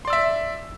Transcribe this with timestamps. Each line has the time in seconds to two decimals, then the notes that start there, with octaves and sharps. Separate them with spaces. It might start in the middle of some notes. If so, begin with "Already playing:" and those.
0.05 C6
0.07 D5
0.10 E6
0.13 E5